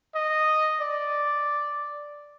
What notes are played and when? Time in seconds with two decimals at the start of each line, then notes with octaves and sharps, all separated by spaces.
0.15 D#5
0.81 D5